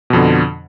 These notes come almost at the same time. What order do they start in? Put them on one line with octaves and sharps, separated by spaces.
B2 F2 D3